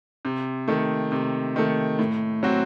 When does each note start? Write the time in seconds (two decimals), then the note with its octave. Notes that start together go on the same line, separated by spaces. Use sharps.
0.25 C3
0.68 D#3 A3
1.12 C3
1.56 D#3 A3
1.99 A2
2.43 F#3 C4 F#4